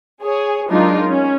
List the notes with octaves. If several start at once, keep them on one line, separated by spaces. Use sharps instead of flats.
G#4 C#5
F#3 G#3 D4 D#4 F4 A#4
C#4